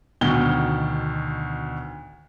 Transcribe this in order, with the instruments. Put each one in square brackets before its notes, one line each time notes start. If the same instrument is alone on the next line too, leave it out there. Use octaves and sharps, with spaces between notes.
[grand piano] D2 B2 D#3 G7